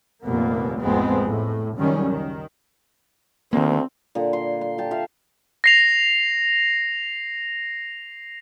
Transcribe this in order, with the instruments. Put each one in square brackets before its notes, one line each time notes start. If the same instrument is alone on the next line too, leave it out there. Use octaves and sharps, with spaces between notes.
[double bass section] F1 D#2 A#2 A#3 B3
A1 F2 G#3 B3 C4
A2
C#2 F#2 D#3 G3 C#4
D#3
[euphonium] D2 [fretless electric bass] D#3 A#3 [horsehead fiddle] C4
[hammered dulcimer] A#2 D3
C6
C6
G4 A5
F4 E5 F5 C6
[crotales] A#6 C7 F7